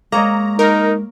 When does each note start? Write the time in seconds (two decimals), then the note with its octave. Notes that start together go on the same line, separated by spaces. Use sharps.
0.12 G#3 A#3 C#5 D#5 A#5
0.59 D#4 A#4